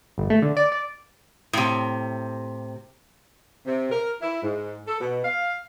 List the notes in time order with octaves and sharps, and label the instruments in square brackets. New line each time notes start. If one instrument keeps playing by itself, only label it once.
[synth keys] G1
A3
D3
D5
D5
[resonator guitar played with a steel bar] A2 C3
[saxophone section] C3
A#4
E4
G#2
A4
B2
F5